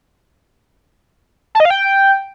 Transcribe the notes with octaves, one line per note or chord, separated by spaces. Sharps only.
A5
D#5
F5
G5